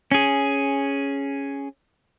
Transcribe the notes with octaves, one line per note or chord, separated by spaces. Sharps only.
C#4 G#4